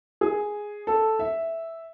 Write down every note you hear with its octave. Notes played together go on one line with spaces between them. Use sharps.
G#4
A4
E5